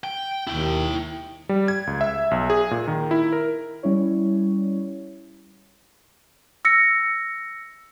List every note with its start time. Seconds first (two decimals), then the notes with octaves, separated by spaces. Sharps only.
0.04 G5
0.47 D#2 E4 G5
1.49 G3
1.68 G#6
1.87 C#2
2.01 E5
2.31 B1
2.50 G#4
2.71 A#2
2.88 D#3
3.11 E4
3.33 A#4
3.83 G3 C#4 E4 C#5
6.65 E6 A#6 C#7